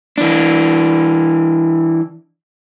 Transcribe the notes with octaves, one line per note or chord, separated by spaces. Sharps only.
E3 D4